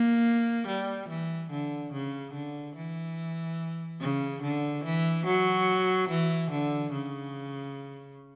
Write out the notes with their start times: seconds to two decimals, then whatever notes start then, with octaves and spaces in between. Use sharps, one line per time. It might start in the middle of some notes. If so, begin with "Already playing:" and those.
Already playing: A#3
0.67 G3
1.08 E3
1.50 D3
1.92 C#3
2.33 D3
2.76 E3
4.00 C#3
4.42 D3
4.84 E3
5.25 F#3
6.09 E3
6.50 D3
6.92 C#3